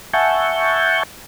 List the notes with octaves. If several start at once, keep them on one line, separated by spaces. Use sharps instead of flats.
E5 F#5 G#5 A5 C#6 G6